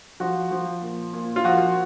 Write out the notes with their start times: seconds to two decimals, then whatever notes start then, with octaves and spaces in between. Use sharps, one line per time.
0.20 F3 F#4
0.51 F3
0.82 A#2
1.13 A#2
1.36 F4
1.44 F3 F#4